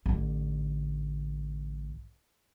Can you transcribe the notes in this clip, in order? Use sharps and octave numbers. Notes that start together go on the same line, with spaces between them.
A1 D3